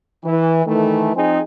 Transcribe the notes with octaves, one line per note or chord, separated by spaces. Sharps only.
E3
D#3 E3 A3
F3 C4 D#4 G#4